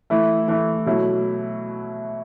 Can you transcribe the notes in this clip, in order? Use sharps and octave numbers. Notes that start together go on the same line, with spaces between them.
E3 A3 E4
E3 A3 E4
B2 F#3 A3 E4